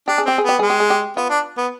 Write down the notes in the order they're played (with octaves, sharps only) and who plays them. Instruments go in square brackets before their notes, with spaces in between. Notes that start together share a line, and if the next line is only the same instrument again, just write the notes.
[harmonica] D4 [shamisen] G4
[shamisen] G#4
[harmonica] C4 [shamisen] G4
[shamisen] G#4
[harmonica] B3 [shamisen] G4
[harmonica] G#3 [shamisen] G#4
[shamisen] G4
G#4
G4
[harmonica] B3 [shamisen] F4
[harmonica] D4
B3